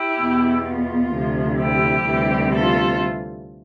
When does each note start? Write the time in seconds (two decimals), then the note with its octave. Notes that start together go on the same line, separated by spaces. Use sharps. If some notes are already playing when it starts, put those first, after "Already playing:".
Already playing: E4 G4
0.19 E2 B2 B3
0.66 F4
1.13 D2 C3 F3
1.60 E4 G4
2.07 D2 C3 E3 G3 C4
2.53 F4 A4